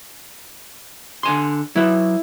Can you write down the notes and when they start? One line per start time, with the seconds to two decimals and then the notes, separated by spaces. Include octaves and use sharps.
1.23 D3 G#5 C6
1.76 F#3 E4 B4